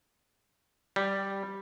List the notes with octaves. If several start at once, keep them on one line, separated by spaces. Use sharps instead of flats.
G3